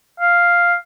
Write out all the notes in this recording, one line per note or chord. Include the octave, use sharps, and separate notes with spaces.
F5